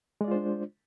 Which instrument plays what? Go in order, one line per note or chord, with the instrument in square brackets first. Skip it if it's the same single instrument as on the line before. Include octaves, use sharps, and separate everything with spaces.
[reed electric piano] G#3
D5
F4
C5
D4